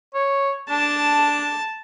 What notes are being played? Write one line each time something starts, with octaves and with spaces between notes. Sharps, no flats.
C#5
D4 A5